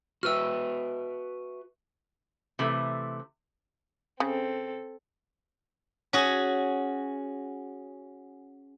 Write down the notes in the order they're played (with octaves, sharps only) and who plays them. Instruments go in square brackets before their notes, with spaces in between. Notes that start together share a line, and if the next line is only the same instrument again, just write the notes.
[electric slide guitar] F#4 B4 E5 [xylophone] E6 F6
[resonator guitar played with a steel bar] C3 E3 A3
[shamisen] C#3 [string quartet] C4 A4
[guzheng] C#4 F#4 G#4